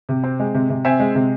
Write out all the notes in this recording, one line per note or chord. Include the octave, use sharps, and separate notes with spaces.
C3
C4
G#3
C3
C3
C4 E5 G#5
G#3
C3